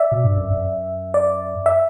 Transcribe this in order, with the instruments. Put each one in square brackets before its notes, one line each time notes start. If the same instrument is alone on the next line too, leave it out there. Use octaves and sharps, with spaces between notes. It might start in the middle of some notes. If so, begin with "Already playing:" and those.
Already playing: [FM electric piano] D5 E5
[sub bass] B2
G2
F#2
F#2
[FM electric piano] D5
E5